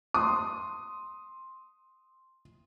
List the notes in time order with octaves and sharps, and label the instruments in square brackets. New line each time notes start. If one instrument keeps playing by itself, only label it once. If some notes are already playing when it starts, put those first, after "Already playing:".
[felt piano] C6 D#6